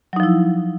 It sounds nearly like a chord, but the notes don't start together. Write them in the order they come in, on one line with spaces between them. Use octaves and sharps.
F#3 D#4 F3 E4